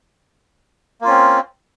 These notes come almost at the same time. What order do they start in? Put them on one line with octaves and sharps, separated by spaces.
A#3 F4 C#4 C4